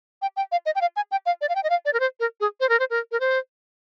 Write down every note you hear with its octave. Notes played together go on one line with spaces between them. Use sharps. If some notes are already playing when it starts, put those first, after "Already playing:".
G5
G5
F5
D#5
G5
F5
G#5
G5
F5
D5
F5
G5
D#5
F5
D5
A#4
C5
A#4
G#4
C5
A#4
C5
A#4
A#4
C5